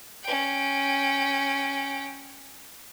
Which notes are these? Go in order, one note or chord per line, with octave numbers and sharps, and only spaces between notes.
C#4 G5